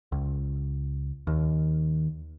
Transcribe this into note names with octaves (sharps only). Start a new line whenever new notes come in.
C#2
D#2